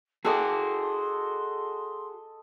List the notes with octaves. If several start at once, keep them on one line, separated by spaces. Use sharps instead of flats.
F#4 G#4 A4 D#5 C6 D6